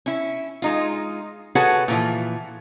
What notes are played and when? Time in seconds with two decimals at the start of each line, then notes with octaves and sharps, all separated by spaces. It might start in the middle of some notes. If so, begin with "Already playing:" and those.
0.06 C#4 E4
0.62 G#3 D#4 F4
1.55 F#4 G#4 A4 B4 C#5 F#5
1.88 A#2 E3 F3